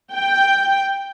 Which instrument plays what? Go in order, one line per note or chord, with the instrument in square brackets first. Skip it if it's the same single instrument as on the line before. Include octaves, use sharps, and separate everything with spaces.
[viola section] G5